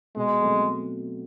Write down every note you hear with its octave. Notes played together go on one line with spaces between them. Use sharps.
B2 G#3
F#3 A3 C4